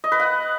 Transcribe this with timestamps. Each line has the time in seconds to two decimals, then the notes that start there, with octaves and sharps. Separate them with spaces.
0.04 D#5
0.12 B4
0.20 F#5